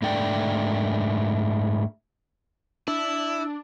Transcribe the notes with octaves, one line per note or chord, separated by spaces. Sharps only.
G#2 A3 D4 D5 G5
D4 E4 E6